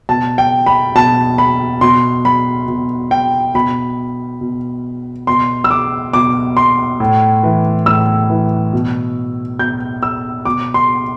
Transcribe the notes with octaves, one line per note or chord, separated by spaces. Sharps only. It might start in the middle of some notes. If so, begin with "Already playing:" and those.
B2 A5
G5
B5
B2 A5
B5
B2 C6
B5
B2
G5
B2 B5
B2
B2 C6
E6
D6
B2 D6
C6
A2
E3
A2 E6
E3
B2
B2 G6
E6
B2 D6
C6